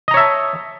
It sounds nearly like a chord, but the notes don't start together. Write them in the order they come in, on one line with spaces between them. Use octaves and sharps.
D#5 A#5 C#5 E5 A5